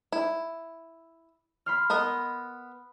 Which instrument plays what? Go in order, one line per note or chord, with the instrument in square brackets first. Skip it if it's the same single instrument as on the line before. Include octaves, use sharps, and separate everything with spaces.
[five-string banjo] E4
[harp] B5 C6 F6
[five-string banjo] B3 A#4 D#5